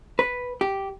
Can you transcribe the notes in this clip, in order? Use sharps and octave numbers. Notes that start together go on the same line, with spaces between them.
B4
G4